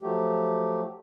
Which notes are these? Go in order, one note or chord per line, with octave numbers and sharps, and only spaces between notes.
F3 F#3 A3 G4